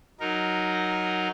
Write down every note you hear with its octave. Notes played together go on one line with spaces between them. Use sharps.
F#3 D#4 A#4